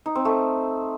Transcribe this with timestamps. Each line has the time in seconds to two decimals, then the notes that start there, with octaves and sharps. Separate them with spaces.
0.06 D#4
0.15 C4
0.25 A3